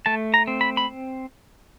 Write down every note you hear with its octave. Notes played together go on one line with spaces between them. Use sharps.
A3 A5
A#5
C4
B5
B5